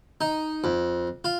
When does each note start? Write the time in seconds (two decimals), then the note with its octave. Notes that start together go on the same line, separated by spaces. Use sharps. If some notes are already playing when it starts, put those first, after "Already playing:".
0.21 D#4
0.64 F2
1.24 F4